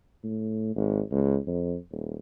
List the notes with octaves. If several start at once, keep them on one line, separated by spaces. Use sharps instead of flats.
A2
G#1
C#2
F2
D#1